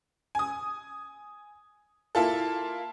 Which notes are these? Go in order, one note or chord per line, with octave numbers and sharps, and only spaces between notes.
G#5 D#6
A#3 E4 F4 A4